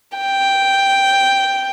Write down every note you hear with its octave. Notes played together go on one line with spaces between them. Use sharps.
G5